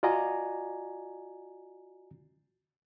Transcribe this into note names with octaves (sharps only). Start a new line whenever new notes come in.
F4 F#4 D5 D#5 G#5 A#5